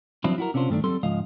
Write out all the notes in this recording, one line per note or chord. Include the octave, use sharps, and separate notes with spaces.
F3 F#3 C4 D4 E4 F4
E4 F#4 A#4
C3 C#4 D4 F4 C5
G2 D#3 A3 A#3 D4
F#3 G3 C4 A4 C6
C#2 G#2 F3 D#5 F5